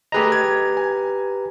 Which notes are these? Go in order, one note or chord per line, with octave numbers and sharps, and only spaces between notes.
A3 G4 G#4 B4 D#5 A#5
G#6
G#5